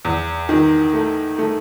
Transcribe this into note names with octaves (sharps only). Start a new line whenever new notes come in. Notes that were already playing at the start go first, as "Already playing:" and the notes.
E2
D#3
A3
A3